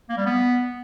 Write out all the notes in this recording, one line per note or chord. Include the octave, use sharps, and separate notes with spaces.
A#3
G3
B3